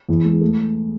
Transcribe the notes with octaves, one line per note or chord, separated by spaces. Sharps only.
E2
G#3
A3